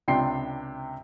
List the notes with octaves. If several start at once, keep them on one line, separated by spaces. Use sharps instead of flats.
C#2 C3 D4 G5 C6 C7